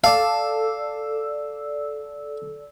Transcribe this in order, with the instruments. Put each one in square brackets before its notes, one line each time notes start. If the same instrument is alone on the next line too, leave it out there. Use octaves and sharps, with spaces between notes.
[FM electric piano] A4 D5 E6 [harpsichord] F5